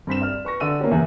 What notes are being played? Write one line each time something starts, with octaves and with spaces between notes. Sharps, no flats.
G2 C4 B6 E7
D5 F6
B4 C#6 A#6
D3 D5 E6 D#7
A#3 B3 C#4 G4
F#1 E2 E5